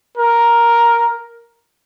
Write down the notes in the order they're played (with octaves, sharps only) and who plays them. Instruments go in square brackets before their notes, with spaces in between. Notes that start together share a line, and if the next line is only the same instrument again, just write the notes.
[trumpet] A#4